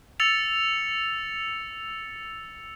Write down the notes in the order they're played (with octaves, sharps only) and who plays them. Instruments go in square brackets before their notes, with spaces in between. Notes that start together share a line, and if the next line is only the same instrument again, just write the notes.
[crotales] E6 A6 C#7 F7